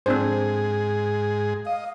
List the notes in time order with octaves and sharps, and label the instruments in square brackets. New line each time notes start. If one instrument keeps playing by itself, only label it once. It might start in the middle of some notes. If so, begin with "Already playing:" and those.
[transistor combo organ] G#2 G#4 [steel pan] C4 D4 C5
[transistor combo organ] D#5 [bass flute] F5